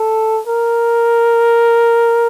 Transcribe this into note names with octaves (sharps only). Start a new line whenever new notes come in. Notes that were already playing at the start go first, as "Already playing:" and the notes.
Already playing: A4
A#4